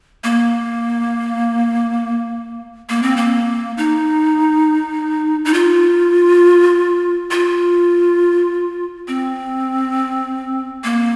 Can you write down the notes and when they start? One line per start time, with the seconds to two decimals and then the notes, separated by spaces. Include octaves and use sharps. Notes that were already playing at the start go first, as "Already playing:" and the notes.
0.24 A#3
2.89 A#3
3.03 C4
3.17 A#3
3.78 D#4
5.45 D#4
5.54 F4
7.31 F4
9.08 C4
10.84 A#3